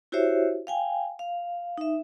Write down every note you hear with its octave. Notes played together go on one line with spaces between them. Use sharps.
E4 F#4 G4 C5 C#5 E5
F5 G5 G#5
F5
D#4 E5